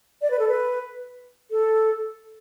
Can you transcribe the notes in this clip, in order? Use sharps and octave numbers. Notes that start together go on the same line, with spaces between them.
D5
B4
A4
B4
A4